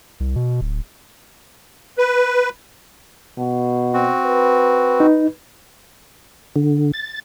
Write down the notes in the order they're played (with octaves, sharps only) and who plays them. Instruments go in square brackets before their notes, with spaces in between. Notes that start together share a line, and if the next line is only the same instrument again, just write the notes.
[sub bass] C2
B2
D1
[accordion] B4
[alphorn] B2
[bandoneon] C4 F#4
[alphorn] B4
[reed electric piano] D#4
[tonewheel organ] D3
A6